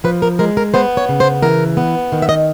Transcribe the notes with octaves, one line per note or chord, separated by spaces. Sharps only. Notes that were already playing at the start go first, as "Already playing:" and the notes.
F3 B4
A#4
G#3 A#4
A#4
B3 C5
C#5
C#3
C5
E3 A#4
B3
D#3
E5
D#5